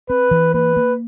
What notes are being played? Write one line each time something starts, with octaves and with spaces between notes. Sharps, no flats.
C4 B4
E3
A#3 B4
A#3